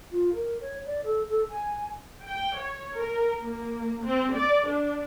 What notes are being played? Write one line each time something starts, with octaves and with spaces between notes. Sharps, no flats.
F4
A#4
C#5
D5
A4
A4
G#5
G5
C#5
A#4
A#3
C4
D5
D4